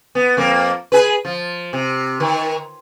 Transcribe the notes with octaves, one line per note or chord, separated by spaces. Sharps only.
B3
F2 A#3
G#4 B4
F3
C3
D#3